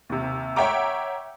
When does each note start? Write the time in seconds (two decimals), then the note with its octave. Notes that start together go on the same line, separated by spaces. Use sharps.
0.09 D#2 C3
0.56 C#5 E5 F#5 G5 A#5 D6